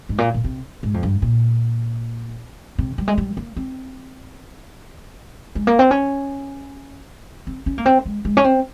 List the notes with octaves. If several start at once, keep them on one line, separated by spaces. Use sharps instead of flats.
G#2
A#2
A#2
C3
G#2
F2
G2
A#2
C3
G3
G#3
G3
A#3
C4
G#3
A#3
C4
C#4
C4
C#4
A#3
C4
G#3
G#3
C#4
C4